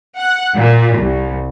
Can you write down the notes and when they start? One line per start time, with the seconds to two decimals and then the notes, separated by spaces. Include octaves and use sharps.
0.19 F#5
0.55 A#2
0.96 C2